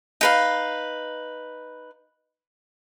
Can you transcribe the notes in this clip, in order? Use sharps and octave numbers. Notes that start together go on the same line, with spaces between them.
D#4 B4 F5